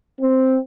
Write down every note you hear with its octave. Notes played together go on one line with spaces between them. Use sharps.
C4